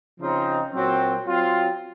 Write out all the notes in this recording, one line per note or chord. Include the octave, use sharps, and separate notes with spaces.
C#3 F3 C4 D#4
A#2 F#3 C4
F#3 C4 F4